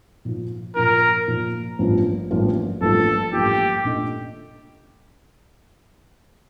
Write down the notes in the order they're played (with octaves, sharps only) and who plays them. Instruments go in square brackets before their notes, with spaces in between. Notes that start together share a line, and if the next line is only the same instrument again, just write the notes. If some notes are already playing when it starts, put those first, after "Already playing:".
[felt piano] A#2 F3 A#3 F4
[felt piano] A#2 F3 A#3 F4 [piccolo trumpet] A#4
[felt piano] A#2 F3 A#3 F4
A1 G2 F3 A#3 F4
A1 G2 F3 A#3 F4
[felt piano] A1 G2 F3 A#3 F4 [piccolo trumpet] A4
[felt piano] A1 G2 F3 A#3 F4 [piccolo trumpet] G4
[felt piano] A#2 A3 D4 A4 D#5